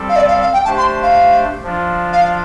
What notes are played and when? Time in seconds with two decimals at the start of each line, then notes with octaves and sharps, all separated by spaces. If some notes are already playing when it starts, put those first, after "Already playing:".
Already playing: G3 C4 A4
0.09 F5
0.16 D5
0.28 F5
0.41 F5
0.53 G5
0.65 A3 D4 G4 C5 A5
0.78 C6
1.02 F5
1.63 F3 D4 F4
2.13 F5